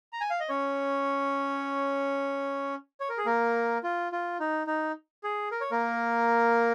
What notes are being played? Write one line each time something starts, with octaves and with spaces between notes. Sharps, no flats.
A#5
G#5
F5
D#5
C#4 C#5
C#5
A#4
G#4
A#3 A#4
F4
F4
D#4
D#4
G#4
A#4
C#5
A#3 A#4